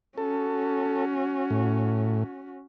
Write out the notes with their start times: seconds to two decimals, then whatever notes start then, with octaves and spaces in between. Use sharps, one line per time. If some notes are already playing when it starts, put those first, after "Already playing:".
0.18 C#4 F#4 A4
1.50 A2